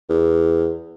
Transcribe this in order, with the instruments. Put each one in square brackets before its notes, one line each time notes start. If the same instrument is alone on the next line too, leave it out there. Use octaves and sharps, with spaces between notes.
[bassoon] E2